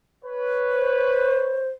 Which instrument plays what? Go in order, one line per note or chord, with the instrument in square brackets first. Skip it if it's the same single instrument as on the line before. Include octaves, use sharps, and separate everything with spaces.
[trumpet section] B4 C#5
[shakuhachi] C5